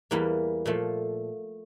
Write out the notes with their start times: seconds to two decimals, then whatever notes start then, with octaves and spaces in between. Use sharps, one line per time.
0.11 E2 E3 G3 A#3
0.66 A#2 F3 A3